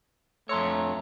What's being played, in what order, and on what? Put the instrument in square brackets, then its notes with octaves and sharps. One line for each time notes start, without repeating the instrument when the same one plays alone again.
[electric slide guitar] F2 C#5 [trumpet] A3 [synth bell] A#5 C6 E6